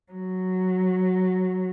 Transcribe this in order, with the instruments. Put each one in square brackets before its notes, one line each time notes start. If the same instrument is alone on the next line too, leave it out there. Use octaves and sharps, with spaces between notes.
[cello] F#3